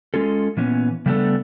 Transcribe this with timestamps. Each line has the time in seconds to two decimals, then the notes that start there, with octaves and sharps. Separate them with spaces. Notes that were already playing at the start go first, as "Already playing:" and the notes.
0.14 G#3 C#4 F4 A4
0.57 A#2 E3 B3 C#4
1.06 C#3 G3 A3 B3 D4 A4